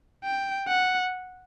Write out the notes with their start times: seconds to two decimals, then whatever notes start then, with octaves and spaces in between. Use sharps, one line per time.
0.25 G5
0.68 F#5